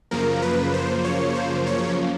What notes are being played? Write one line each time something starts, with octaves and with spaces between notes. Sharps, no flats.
F#2 C#3 F3 A#3 A#4
B4
C5
C#5
C5
C#5